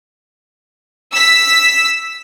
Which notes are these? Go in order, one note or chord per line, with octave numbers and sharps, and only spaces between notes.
E6 B6